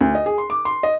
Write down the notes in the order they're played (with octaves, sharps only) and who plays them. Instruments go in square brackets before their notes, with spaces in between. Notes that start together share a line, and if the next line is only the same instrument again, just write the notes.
[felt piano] D2
D#5
G#4
C6
D6
C6
D#5